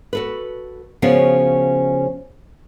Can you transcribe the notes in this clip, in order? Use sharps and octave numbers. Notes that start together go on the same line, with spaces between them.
F#4 A4 B4
C#3 F3 B3 C#4 F#4